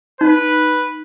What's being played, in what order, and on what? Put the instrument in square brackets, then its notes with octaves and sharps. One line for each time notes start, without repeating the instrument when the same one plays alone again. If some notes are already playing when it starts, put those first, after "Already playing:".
[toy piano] D#4 [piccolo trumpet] B4